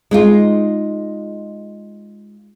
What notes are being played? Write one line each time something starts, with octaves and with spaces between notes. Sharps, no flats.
G#3 D#4 F4